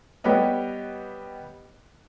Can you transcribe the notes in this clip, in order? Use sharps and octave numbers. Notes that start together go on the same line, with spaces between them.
G3 B3 G4 B4 C#5 D#5